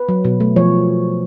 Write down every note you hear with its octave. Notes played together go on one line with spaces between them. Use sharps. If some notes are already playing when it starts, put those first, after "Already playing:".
Already playing: B4
F#3
B2
A3
F3 C#5